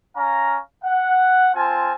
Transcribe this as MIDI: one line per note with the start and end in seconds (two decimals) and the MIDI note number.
0.16 0.57 61
0.16 0.57 77
0.16 0.57 82
0.84 1.49 78
1.54 1.93 60
1.54 1.93 65
1.54 1.93 80
1.54 1.93 81